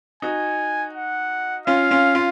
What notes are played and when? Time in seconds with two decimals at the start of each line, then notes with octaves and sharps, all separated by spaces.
0.22 D#4 F#4 G#5
0.94 F#5
1.67 C#4 F4 F5
1.91 C#4 F4
2.15 C#4 F4